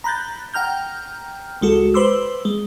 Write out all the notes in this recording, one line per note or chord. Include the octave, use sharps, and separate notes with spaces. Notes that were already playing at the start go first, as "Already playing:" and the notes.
A#5 B5 F#6 G6 A6
F#5 G5 A#5 F6 G6
C#2 G#3 F#4 A4
B4 C5 B5 C6 D6 E6
G#3